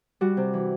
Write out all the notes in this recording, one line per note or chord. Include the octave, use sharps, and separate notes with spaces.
G3 F#4
C3
E3